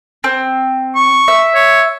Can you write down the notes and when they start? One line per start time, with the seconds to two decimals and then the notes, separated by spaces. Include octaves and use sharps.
0.24 C4
0.96 C#6
1.28 E5
1.55 C#5